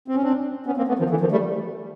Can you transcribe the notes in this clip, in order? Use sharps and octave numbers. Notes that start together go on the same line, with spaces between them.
C4
C#4
C4 D4
B3 C#4
A#3 C4
A3 B3
D#3 F3
D3 E3
D#3 F3
G3 A3